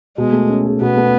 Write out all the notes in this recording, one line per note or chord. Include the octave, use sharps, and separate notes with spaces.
B2 G#3
A3
C#4
G#4
B2 B3
A3